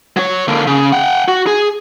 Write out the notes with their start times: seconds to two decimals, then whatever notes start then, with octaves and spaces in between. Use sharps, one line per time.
0.17 F#3 C#5
0.48 D3 A#3
0.67 C#3
0.92 F#5 G5
1.28 F#4
1.47 G#4